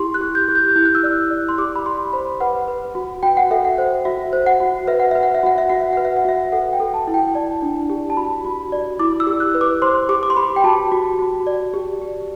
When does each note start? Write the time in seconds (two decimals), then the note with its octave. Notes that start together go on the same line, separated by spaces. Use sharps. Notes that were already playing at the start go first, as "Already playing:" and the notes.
Already playing: E4 G4 C6
0.14 F#6
0.21 G4
0.35 G6
0.48 G4
0.55 G6
0.76 E4 G6
0.85 F#6
0.95 E6
1.03 D5 F#6
1.30 D5
1.49 C6
1.58 G4 D6
1.76 B5
1.85 G4 C6
2.13 C5 B5
2.41 B4 F#5
2.68 B4
2.95 F#4
3.23 F#4 G5
3.37 F#5
3.51 A4 E5
3.65 F#5
3.78 C5
4.05 F#4 E5
4.33 C5
4.46 F#5
4.60 F#4
4.88 B4 E5
5.00 F#5
5.11 B4 E5
5.23 F#5
5.35 E5
5.43 F#4 F#5
5.58 E5
5.70 F#4 F#5
5.81 E5
5.93 B4 F#5
6.05 E5
6.16 F#5
6.25 F#4 E5
6.52 A4 F#5
6.73 G5
6.80 A4
6.94 A5
7.08 E4
7.14 G5
7.35 D5 A5
7.62 D4
7.90 G4
8.10 A5
8.17 F#4 B5
8.45 F#4
8.72 D5
8.99 E4 D6
9.20 E6
9.27 G4
9.40 F#6
9.55 B4
9.61 D6
9.82 C5 C6
10.09 G4 D6
10.23 D6
10.30 C6
10.37 G4 B5
10.56 G5
10.64 F#4 A5
10.92 F#4
11.19 F#4
11.47 D5
11.74 G4
12.01 G4